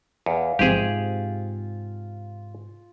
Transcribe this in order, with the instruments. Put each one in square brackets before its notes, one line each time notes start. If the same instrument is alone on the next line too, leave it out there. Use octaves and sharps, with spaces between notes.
[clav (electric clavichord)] E2 [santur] F5
[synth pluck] A1 F3 C4 [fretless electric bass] G#2 C3 [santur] F4 [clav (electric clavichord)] G4 G#4